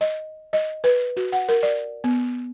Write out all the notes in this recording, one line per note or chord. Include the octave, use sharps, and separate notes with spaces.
D#5
D#5
B4
F#4
F#5
A#4
D5
B3